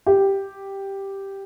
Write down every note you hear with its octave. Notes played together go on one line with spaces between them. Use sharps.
G4